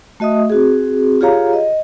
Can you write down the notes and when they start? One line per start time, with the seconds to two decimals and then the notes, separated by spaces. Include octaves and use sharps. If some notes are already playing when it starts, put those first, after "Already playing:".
0.20 A3 F#4 D#5 E5 D#6
0.50 C4 F#4 G#4
1.21 F4 G4 G#4 C#5 F5 A#5
1.53 D#5